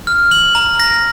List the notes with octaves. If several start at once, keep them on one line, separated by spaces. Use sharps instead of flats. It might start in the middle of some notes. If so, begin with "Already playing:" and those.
F6
F#7
A#5
A#6